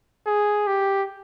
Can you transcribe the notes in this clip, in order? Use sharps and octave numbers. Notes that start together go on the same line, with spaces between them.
G#4
G4